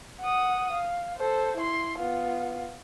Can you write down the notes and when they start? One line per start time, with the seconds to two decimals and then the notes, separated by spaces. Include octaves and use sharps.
0.20 F#5 D#6
0.71 F5
1.16 A4 C5
1.56 E4 C6
1.98 B3 F4